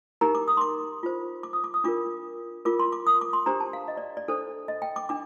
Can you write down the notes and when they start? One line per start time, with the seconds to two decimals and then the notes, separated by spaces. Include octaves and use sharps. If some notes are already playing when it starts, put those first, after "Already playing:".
0.21 D#4 G4 A#4 A#5
0.35 D6
0.48 D#6
0.57 C6
0.61 D6
1.03 F4 C5
1.43 D6
1.53 D#6
1.64 D6
1.74 D#6
1.84 D4 F4 A#4 D6
2.65 F4 A#4 D6
2.79 C6
2.93 D6
3.07 D#6
3.21 D6
3.33 C6
3.46 D4 G4 C5 A#5
3.60 A5
3.73 F5
3.88 D#5
3.97 D5
4.17 D5
4.28 D4 A4 C5
4.68 D#5
4.82 G5
4.96 D6
5.09 D4 D6